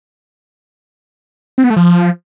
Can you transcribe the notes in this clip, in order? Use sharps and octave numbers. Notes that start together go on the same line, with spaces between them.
C4
B3
A3
F3